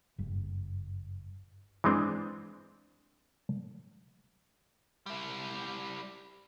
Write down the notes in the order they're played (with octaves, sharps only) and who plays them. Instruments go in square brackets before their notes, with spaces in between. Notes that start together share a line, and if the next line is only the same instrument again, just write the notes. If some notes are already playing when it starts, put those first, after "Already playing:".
[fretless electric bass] F#1 G2
[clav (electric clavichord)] E3 G#3 C4 D4
[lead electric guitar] G3 E4